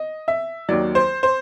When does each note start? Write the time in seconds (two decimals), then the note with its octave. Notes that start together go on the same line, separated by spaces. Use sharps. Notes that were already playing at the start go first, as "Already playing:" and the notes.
Already playing: D#5
0.28 E5
0.69 D#2 D#3 F#3 D5
0.95 C5
1.23 C5